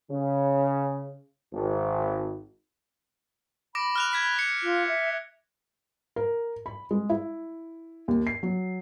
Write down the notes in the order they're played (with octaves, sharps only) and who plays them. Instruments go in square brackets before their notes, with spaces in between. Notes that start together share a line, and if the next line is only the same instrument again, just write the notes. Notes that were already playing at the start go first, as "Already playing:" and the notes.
[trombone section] C#3
G#1
[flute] B5 [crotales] D6 A#6 D7
[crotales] F6 F#6 F7
G#6 B6
C#7
[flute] F4
E5
[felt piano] A#4
B5
G#3
E4
D#2
C7
F#3